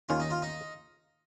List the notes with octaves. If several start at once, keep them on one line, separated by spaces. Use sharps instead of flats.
D#2 D#3 C#4 F4
D#4
F4
D#4